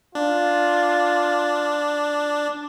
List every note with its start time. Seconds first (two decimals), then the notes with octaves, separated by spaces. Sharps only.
0.15 D4 F4